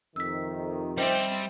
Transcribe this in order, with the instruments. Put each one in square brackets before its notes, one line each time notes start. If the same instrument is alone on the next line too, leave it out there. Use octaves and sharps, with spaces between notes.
[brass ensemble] F2 C3 D#3 [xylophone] E6 B6
[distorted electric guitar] G3 [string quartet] C4 [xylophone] C5 D#5 E5